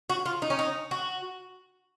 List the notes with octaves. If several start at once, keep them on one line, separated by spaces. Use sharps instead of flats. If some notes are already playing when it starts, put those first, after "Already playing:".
F#4
F4
D#4
C#4
D#4
F#4